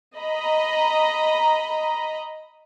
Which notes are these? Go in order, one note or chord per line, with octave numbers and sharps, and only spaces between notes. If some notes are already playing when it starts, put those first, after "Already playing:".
D#5 A#5 B5